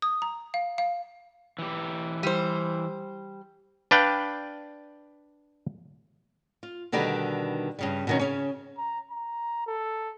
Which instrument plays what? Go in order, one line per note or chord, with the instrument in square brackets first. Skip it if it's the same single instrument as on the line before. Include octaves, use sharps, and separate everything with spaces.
[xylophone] D#6
A#5
F5
F5
[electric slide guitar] E3 G4
[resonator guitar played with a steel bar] G3 C5
[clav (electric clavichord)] D4 B4 D5 F5 G5
[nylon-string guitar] F4
B2 D3 D#3 G3 G4 B4
G2 C#3 G3
B2 D#3 C#4
C#3 C#4
[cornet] A#5
A#5
A4